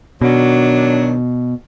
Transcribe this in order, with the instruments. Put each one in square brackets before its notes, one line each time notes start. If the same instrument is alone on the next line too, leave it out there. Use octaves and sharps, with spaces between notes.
[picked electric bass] B2 [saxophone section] D#3 F#3 D4